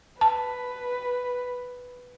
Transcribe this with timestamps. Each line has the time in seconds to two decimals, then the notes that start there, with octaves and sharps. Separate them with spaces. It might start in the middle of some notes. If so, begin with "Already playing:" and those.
0.21 B4 A5